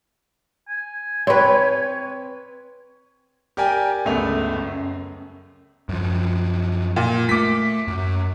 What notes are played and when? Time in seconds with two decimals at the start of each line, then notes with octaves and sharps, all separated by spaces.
0.69 G#5
1.27 C4 B4 C#5
3.57 G4 A#4 D5 G5 G#5
4.05 G1 C#2 A3 B3 F7
4.56 F#2
5.89 F#2 F3
6.96 A#2
7.29 A3 D6 B6
7.88 F#2